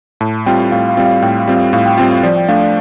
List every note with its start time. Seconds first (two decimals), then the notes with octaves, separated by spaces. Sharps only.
0.21 A2 A5
0.46 G3 C4 F4 G5
0.71 A2 F5
0.89 F5
0.97 G3 C4 F4
1.05 F5
1.22 A2 G5
1.39 F5
1.47 G3 C4 F4
1.56 F5
1.73 A2 F5
1.85 G5
1.98 G3 C4 F4 G5
2.11 F5
2.23 F3 D5
2.36 G5
2.48 A3 D4 F5
2.61 D5